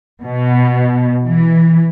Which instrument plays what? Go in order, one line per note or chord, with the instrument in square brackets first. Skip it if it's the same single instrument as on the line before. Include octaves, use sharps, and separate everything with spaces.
[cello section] B2
E3